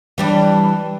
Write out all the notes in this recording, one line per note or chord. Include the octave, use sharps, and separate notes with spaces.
E3 G3 D4